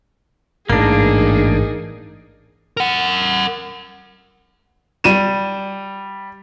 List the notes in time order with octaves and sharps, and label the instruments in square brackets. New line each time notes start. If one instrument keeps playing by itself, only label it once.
[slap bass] A1 G#2 E3 [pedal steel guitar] A#3 D4 [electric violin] D#4 G#4 [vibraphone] A#4
[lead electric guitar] A#4 F#5
[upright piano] G3 D#7 E7